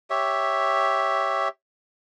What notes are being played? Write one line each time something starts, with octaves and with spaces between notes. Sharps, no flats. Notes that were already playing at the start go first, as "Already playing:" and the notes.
G4 C#5 E5